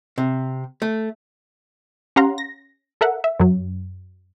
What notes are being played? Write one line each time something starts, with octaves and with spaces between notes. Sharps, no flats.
C3
A3
C#4 G4 F5 F#5 A#5 C6
A#6
A4 A#4 E5 F#5
E5
F#2 F#3